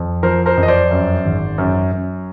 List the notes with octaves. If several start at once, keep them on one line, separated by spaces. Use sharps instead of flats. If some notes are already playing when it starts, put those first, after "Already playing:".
Already playing: F2
F3 A#4 C5
A#4 C5
F2
D#5
C5 D5
F#2
G#1
F#2
F#2